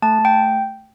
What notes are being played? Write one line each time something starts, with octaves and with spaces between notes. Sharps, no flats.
A3 A5
A3
G5